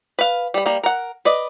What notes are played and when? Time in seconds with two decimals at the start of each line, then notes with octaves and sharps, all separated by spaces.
0.19 B4 F5
0.54 G3 B5
0.66 G3 A#3
0.83 A#4 F#5
1.25 B4 D5 D#5